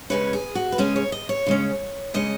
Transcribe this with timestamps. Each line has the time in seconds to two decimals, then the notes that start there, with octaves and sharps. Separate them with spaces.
0.10 C#3 G#3 C#4 B4
0.33 G#4
0.55 F#4
0.72 B4
0.78 C#3 G#3 C#4 G#4
0.96 C#5
1.12 D#5
1.29 C#5
1.46 C#3 G#3 C#4
2.14 C#3 G#3 C#4 D#5